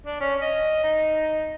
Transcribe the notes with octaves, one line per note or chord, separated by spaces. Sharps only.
D4
C#4
D#5
D#4